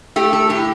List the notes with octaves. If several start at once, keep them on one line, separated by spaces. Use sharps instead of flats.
A3 G4
A4
A2 G4